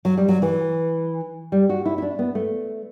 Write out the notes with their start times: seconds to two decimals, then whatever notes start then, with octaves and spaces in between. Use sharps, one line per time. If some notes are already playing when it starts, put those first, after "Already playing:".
0.05 F#3
0.17 G3
0.29 F#3
0.42 E3
1.52 G3
1.69 F#4
1.85 E4
1.98 E4
2.02 D4
2.19 B3
2.35 A3